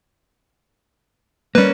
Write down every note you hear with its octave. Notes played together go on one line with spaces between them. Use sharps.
G3 A#3 C#4 B4